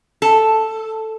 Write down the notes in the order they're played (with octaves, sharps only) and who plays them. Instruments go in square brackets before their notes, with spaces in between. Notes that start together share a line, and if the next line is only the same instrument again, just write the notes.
[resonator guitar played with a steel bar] A4